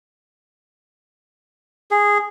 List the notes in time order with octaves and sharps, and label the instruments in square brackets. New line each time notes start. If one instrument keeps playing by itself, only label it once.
[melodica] G#4